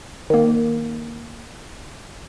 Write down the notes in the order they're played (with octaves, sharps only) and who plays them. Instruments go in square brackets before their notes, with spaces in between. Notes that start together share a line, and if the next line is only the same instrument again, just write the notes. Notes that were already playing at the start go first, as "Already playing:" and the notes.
[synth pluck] D#3 A#3